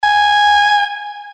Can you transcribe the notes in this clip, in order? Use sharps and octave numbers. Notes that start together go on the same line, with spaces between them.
G#5